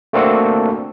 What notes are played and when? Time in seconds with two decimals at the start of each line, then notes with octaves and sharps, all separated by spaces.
0.13 A3 A#3 C4 D4 F#4 A4